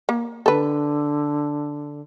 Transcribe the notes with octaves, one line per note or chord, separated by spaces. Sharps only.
A#3
D3 A4 B4